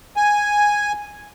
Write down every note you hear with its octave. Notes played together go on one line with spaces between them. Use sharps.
G#5